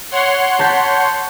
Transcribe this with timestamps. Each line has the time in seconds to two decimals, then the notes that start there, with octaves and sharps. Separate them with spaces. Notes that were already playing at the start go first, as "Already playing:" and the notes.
0.11 C#5 F#5 C6
0.59 A5 G6 B6